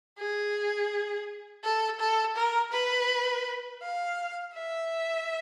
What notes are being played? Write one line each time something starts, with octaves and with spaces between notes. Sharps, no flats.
G#4
A4
A4
A#4
B4
F5
E5